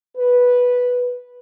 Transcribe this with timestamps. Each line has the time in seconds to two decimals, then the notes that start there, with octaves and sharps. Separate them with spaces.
0.17 B4